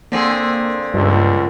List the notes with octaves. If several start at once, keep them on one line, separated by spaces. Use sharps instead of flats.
D3 A#3 C4 G#4
C#2 G2